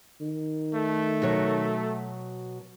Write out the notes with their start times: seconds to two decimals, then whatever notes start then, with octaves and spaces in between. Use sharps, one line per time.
0.21 D#3
0.75 A3
1.22 B2 F#3 C#5